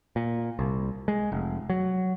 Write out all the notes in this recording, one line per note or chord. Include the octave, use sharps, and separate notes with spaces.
A#2
C2
G#3
F1
F#3